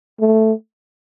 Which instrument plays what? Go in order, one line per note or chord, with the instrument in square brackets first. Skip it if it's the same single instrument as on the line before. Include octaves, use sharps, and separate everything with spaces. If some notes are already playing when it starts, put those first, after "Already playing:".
[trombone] A3